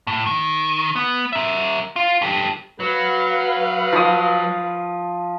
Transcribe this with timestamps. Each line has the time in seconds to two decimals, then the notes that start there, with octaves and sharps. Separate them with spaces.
0.07 A2
0.26 D#3
0.96 B3
1.33 A#4 E5
1.96 F4
2.22 G4 A4
2.80 F#3 B4 F5
3.93 F3 D#6